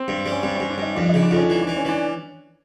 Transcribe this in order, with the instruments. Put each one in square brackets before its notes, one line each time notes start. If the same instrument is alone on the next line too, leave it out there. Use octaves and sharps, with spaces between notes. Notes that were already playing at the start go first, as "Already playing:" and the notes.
Already playing: [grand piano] C4
[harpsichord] G2
G3
[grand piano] C#4
[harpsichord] G2 [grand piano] C4
[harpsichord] G2 [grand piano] C#4
[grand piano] D4
[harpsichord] G2 [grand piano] D#4
[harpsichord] F2 [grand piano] D4
[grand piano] D#4
[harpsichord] C#3
[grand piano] D4
[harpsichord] F2
[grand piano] C#4
[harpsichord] E3
[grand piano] D4
[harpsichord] E3
[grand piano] C#4
[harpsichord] E3 [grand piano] D4